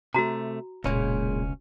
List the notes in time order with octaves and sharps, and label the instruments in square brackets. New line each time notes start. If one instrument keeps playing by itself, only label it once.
[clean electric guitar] C3 A3 [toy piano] F#4 A#5
[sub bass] E1 [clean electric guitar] C#2 C#4 [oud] A#2 G#3